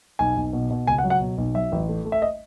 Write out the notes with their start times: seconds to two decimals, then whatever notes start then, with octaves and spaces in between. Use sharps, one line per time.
0.19 B1 G#5
0.37 B1
0.53 B2
0.71 B2
0.87 C#2 G#5
0.98 F#5
1.04 F#3
1.10 F#5
1.21 B2
1.38 B1
1.54 F#3 E5
1.72 A1
1.89 A3
2.05 A3
2.12 E5
2.22 D#5